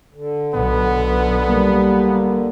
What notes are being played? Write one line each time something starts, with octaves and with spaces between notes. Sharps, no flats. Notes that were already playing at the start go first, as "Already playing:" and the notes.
D3
B1 B3
G3 A#3